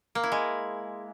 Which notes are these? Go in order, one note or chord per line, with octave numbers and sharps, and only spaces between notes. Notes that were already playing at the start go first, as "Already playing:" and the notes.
A#3
E4
G#3